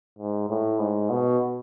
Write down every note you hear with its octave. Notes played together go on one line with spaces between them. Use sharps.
G#2
A2
G#2
B2